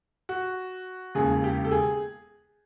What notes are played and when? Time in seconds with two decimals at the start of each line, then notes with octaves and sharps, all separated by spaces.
0.29 F#4
1.15 E1 D#2 C#3 G#4
1.44 G4
1.65 A4
1.71 G#4